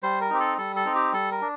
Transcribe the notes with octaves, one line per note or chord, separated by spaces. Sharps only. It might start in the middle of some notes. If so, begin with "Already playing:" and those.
G3 C5
A#4
C4 D#4 G4
A4
G3 A4
A4
C4 D#4
G4
G3 A4
A#4
D4